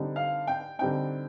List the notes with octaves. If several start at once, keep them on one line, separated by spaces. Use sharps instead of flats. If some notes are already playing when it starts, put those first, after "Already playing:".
Already playing: D3 G3 C4 D#4
F5
G5
D3 G3 C4 D#4 G5